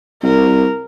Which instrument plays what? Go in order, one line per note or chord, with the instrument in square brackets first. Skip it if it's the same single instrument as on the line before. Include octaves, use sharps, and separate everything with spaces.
[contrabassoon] C2 [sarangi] A#4